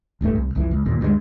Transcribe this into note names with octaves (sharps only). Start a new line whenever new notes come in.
D1 A1 G2 A3
C2
F#1 C2 F2 E3
C#2
G1 D#2 A#2
D2 G2 E3 G#3